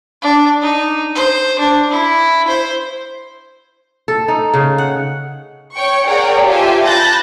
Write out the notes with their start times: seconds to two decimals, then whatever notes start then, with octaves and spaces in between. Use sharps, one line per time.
0.22 D4
0.61 D#4
1.15 C5
1.59 D4
1.91 E4
2.48 C5
4.08 A4
4.28 D#4
4.54 C#3
4.78 F#5
5.73 C#5 G5 C#6
6.05 G#4 A#4 C#5 D5 F#5 G5
6.45 F4 G4 A4 C5 E5 G#5
6.85 A5 B5 F#6 G6 A6 A#6